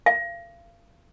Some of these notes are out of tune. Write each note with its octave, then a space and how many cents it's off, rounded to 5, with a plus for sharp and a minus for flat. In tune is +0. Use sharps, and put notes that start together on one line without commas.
F5 -30